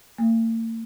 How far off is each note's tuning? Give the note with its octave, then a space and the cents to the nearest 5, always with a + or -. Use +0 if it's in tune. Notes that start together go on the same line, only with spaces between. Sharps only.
A#3 -45